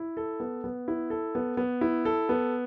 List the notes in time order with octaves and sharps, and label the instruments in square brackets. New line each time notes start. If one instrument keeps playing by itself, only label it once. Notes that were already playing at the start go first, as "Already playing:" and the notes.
Already playing: [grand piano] E4
A4
B3
B3
E4
A4
B3
B3
E4
A4
B3